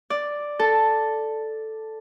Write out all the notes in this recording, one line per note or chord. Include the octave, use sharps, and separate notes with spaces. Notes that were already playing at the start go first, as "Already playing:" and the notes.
D5
A4